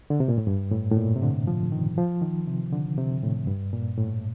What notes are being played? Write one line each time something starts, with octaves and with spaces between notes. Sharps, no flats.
D3
C3
A#2
A2
G2
A2
A2
A#2
C3
D3
F3
D#3
F3
D#3
C3
D3
C3
A2
G2
A#2
A2